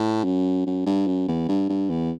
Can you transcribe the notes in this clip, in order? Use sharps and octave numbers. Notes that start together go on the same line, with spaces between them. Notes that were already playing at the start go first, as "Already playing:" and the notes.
Already playing: A2
F#2
F#2
G2
F#2
E2
G2
G2
E2